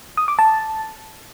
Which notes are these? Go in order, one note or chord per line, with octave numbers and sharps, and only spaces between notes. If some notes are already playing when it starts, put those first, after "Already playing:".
D#6
D6
A5